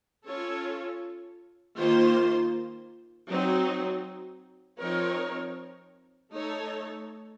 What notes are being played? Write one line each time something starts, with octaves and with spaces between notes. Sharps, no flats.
C#4 F4 A4 C#5
D#3 A#3 F4 C5
F#3 C4 D#4
F3 C4 D#4 A#4 C#5
A3 D#4 A4 C#5